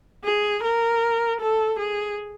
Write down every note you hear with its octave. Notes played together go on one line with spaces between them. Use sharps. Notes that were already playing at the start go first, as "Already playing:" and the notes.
G#4
A#4
A4
G#4